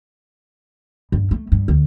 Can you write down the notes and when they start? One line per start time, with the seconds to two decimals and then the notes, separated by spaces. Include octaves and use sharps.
1.12 G2
1.31 A3
1.52 G2
1.68 D2